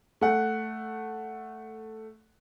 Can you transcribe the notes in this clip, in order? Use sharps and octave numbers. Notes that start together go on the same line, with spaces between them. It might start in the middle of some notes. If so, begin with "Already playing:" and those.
A3 F#5